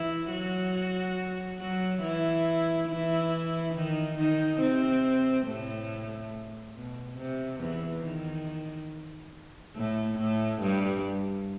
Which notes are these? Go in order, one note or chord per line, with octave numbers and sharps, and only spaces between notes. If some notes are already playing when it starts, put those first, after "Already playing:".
Already playing: E3 E4
F#3 F#4
F#3 F#4
E3 E4
E3 E4
D#3 D#4
D#3 D#4
C3 C4
A2 A3
B2
C3
E2 E3
D#3
A2 A3
A2 A3
G2 G3